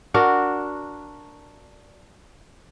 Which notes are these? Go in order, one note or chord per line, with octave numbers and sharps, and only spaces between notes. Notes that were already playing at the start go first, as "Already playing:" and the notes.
D4 F#4 A#4